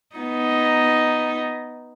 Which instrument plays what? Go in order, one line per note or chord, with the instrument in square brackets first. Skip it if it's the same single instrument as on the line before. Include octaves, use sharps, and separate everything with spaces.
[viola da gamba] B3 D#4